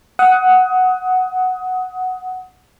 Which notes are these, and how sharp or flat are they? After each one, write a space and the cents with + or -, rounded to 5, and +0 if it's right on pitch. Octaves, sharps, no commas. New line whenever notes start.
F#5 +0 D#6 +20